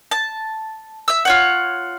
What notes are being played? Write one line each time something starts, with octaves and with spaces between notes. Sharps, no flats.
A5
E5 E6
F4 C#5 F#5